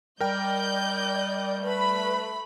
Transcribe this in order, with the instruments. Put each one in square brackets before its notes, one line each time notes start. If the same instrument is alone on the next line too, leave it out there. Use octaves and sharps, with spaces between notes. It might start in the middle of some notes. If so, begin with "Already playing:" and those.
[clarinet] G3 [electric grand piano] A#4 G5 [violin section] D5 D#5 G6
[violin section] A3 B5 [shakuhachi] B4